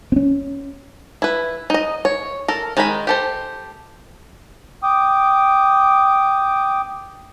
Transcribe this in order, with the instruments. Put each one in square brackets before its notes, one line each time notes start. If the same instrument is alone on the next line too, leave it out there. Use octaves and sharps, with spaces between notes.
[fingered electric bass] C4 C#4
[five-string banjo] E4 B4
D#4 D#5
C#5
A4 A#4
D#3 G#3 D#4 A#4 B5
G4 A4 C5
[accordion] G5 D6 D#6